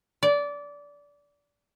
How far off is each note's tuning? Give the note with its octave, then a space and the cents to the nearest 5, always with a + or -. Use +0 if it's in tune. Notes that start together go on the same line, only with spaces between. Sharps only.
D5 -20